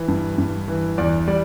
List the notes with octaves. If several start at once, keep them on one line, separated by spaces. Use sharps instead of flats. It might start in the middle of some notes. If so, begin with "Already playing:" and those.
Already playing: E3
G2
G2
E3
E2 D5
G3 D5